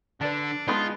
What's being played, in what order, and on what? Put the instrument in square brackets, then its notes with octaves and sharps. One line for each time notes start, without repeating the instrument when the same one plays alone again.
[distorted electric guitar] D3 [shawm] D4 [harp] B4 D5 A5
[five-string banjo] G#3 B3 D#4 [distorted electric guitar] F4 [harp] A5 B5